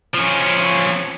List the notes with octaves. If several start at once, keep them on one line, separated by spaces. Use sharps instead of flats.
F3 C#4